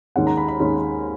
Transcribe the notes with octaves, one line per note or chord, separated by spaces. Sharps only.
D#2 D#3 G#3 C#4 F#5
A#5
B5
B5
D#2 D#3 G#3 C#4